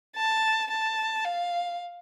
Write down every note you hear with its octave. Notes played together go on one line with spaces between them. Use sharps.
A5
A5
F5